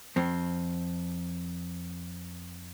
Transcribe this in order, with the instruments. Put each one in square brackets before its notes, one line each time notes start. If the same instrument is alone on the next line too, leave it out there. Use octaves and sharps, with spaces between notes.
[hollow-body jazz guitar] F2 C4